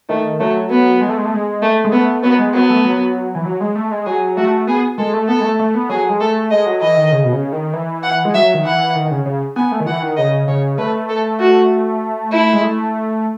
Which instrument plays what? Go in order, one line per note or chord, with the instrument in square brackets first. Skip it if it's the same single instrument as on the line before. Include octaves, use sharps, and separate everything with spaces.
[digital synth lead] D#3 [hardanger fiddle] A3
[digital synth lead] F#3 [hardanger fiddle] A3
[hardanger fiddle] B3
[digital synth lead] G#3
A3
G#3
A3
G#3
[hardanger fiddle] A3
[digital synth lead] G#3
[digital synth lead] A3 [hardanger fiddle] B3
[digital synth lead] F#3 [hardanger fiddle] B3
[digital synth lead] G#3
[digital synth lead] F#3 [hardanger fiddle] B3
[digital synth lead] A3
F#3
E3
F#3
G#3
A3
G#3
[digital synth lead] F#3 [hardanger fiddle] G#4
[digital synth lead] A3 [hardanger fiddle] F#4
[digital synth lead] B3 [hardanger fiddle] G#4
[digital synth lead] G#3 [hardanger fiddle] A4
[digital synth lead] A3
[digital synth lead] B3 [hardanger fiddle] A4
[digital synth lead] G#3
A3
A3
B3
[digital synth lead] F#3 [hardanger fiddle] G#4
[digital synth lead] G#3
[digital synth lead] A3 [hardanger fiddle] A4
[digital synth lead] G#3 [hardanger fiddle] D#5
[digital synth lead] F#3
[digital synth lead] E3 [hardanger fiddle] D#5
[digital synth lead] D#3
C#3
B2
C#3
D#3
E3
[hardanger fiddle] F#5
[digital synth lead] G#3
[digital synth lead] F#3 [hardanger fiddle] E5
[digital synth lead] D#3
[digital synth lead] E3 [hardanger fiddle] F#5
[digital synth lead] D#3
D#3
C#3
C#3
[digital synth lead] B3 [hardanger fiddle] G#5
[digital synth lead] A3
D#3
[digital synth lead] E3 [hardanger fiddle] F#5
[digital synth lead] D#3
[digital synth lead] C#3 [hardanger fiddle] D#5
[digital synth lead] C#3 [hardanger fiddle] C#5
[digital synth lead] A3 [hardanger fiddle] B4
[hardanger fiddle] A4
F#4
E4
[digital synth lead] G#3
A3